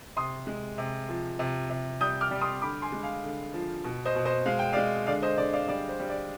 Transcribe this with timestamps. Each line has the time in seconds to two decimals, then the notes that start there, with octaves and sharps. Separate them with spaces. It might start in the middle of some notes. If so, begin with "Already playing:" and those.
0.16 C3 C6 D#6
0.47 G#3
0.78 C3
1.09 F3
1.39 C3
1.70 C3
2.01 G3 D#6 G6
2.21 D6 F6
2.31 G3
2.41 C6 D#6
2.62 D3 B5 D6
2.82 G#5 C6
2.92 G#3
3.03 F5 G#5
3.23 D3
3.53 F3
3.84 B2
4.05 C5 D#5
4.15 B2
4.25 C5 D#5
4.46 G#3 F5
4.59 G5
4.73 G#3 D5 F5
5.07 D3 D5 F5
5.22 C5 D#5
5.38 D3 D5
5.53 D5 F5
5.68 G3 D5
5.89 C5
5.99 G3
6.09 D5